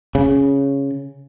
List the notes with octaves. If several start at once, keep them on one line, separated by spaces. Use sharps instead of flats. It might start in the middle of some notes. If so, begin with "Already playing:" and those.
C#3